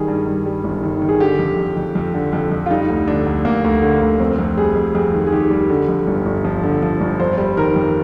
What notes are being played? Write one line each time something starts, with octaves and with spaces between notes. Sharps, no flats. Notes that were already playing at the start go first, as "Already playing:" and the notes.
Already playing: D#3 G3 G#4
G2
G2
G3
G1
D#3
D#3
G#4
D3 G4
F2
F2
F2
F2
D3
F2
F2
F4
G3 D#4
D2
D3 D4
D2
D2 A#3
D2
D3
D2
F2 C4
F2
G3 G#4
F2
F2 G#4
D#3
G#4
D#3 G4
G3
D3
F2
G1
G1
F3
D3
F3
G1
F2 C5
G3
D#3 A#4
F2